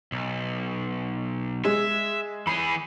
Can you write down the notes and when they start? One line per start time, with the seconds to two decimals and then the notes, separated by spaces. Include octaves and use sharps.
0.12 B1
1.65 G#3 E5
2.47 E3 G#4 B5